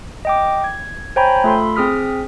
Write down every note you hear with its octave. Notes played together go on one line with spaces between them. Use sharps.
D#5 G5 D6
G#6
C5 C#5 G5 G#5 A#5 B5
A3 F4 A4 B5 C6
C4 G#4 D#6 F6 B6